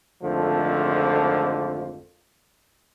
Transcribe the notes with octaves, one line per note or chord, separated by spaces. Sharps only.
G#1 F2 D3 F3 A3